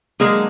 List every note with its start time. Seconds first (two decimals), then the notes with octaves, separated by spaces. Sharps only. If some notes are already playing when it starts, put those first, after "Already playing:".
0.20 D3 F#3 G#3 A#3 G#4